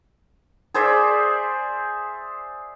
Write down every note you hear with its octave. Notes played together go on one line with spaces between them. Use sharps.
G#4 C5 D5 E5